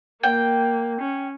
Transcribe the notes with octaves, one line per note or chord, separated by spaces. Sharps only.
A#3 G5
C#4